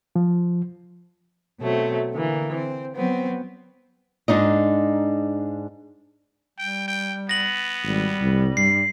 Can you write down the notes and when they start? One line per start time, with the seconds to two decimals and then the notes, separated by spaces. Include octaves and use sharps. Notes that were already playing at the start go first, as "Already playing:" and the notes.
0.16 F3
1.61 B2 F#3 A3 C4
2.14 D3 E3 A#3
2.55 C4
2.96 F#3 B3 C4
4.28 G#2 D4 D#4 D#5
6.59 G3 G5
6.88 G5
7.29 B3 A#6 F#7
7.83 G#1 G3
8.21 C2
8.57 G2 C7